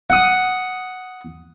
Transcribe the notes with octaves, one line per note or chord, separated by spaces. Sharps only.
F#5 D#6